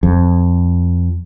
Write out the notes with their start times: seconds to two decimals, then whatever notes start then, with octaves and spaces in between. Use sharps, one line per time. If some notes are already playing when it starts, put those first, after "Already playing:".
0.03 F2